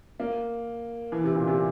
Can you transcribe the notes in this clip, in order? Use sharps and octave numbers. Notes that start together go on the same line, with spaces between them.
A#3
E3
C3
A#2
C3